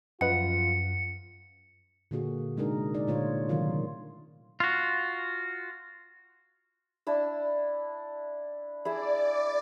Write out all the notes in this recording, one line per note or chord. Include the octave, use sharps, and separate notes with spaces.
F#2 F3 F4 B4 D#5 F#5 C#7
A#2 D3 A#3 F#4 G#4
C3 G#3 D4 D#4 G#4 A#4
D#4 D5
A#2 D3 A3 F4 C5 C#5
C3 D#3 F#3 F4 A#4
F4 F#4
D4 E4 E6
E4 G#4 D5 E6